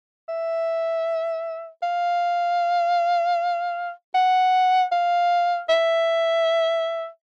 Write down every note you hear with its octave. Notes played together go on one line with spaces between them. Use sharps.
E5
F5
F#5
F5
E5